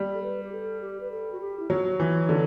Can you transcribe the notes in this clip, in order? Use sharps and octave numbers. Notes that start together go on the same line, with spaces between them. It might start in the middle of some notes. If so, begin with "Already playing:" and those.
Already playing: G3
A4
B4
G4
A4
G4
B4
A4
F#4
G4
E4
F#3 F#4
E3
D3